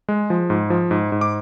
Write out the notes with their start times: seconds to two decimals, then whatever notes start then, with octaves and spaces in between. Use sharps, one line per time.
0.09 G#3
0.30 F3
0.50 G#2
0.70 F3
0.91 G#2
1.12 G#2
1.21 D6